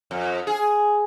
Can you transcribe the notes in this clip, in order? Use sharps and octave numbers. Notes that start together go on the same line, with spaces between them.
F2
G#4